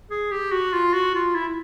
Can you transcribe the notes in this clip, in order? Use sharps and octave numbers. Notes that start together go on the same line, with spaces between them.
G#4
G4
F#4
F4
F#4
F4
E4